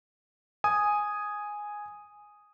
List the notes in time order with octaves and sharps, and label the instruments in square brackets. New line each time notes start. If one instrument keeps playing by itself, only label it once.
[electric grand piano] G#5 D#6